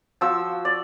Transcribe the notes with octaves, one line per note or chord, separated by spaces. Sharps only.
F3 F#4 E6
D5